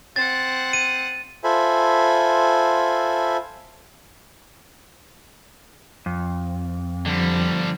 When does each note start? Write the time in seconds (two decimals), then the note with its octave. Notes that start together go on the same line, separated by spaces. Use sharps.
0.16 C4 F#5 A6
0.73 D#7
1.44 F4 A4 C5 E5 G#5 B5
6.06 F2
7.06 D3 F3 G3